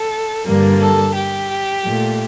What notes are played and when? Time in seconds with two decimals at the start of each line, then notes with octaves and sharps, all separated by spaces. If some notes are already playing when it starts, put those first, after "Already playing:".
Already playing: A4
0.45 G2 D3 G3 A#3
0.80 A4
1.15 G4
1.84 A#2 A3